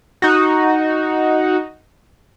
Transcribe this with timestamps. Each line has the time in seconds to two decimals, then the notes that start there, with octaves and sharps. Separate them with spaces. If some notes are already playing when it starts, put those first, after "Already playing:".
0.22 D#4 F#4